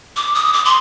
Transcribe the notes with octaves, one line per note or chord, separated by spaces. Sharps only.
D6
D#6
D6
C6